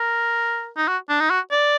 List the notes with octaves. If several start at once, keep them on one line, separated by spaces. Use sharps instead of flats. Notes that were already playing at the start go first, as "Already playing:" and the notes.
Already playing: A#4
D#4
F#4
D4
D#4
F#4
D5